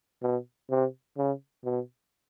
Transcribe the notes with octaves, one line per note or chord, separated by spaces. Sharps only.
B2
C3
C#3
B2